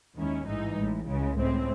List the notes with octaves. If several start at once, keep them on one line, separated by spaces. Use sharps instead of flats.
D#2 D#3 G#3 C#4 E4
A1 G#2 E3 G#3 D#4
A1 A2 G#3
C#2 C#3 G#3
A2 G#3 C4